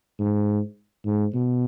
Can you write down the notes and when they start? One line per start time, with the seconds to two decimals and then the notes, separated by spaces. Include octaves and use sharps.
0.19 G#2
1.05 G#2
1.34 B2